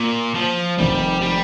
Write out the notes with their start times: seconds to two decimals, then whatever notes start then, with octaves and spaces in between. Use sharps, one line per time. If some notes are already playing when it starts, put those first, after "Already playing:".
Already playing: A#2
0.35 F3
0.78 F1 F2 D#3 G3 A3 C4
1.21 G3